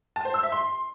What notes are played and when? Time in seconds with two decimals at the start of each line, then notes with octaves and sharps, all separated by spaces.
0.16 A5
0.25 C5
0.34 E6
0.43 E5
0.52 C6